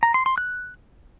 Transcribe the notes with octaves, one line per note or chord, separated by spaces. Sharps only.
A#5
C6
C6
F#6